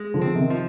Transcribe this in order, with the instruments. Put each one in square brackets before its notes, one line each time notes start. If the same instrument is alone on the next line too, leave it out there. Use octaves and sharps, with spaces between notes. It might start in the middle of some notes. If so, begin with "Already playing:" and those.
Already playing: [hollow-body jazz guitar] G#3
[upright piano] D3 F3
[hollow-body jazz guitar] C4
[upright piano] C3 D#3
[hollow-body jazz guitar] F3